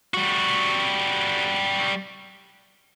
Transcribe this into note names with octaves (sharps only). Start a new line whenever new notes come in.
G3 F#4